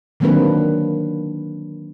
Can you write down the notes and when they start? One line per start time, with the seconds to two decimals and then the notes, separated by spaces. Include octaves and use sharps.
0.20 D#3 F#3 A#3 C4 D4 B4